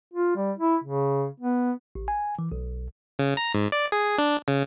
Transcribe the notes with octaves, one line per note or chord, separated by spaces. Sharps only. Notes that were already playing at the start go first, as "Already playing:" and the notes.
F4
G3
E4
C#3
B3
A1
G#5
E3
B1
C#3
A#5
G#2
D5
G#4
D4
C#3